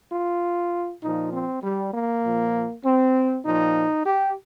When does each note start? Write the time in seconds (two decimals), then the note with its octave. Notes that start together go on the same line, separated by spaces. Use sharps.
0.12 F4
1.03 A#2 F3 D#4
1.33 C4
1.63 G3
1.94 A#3
2.24 A#2 F3
2.85 C4
3.46 A#2 F3 D#4
4.06 G4